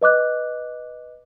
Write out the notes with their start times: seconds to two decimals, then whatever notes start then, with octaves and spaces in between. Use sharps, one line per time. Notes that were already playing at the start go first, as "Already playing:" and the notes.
0.01 B4 D#5 D6 F#6